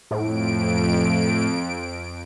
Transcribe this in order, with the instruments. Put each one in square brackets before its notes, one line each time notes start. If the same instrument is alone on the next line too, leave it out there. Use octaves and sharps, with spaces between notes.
[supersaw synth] F2 D7 [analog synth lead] A2